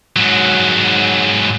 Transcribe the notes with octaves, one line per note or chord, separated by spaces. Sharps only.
G#2 F#3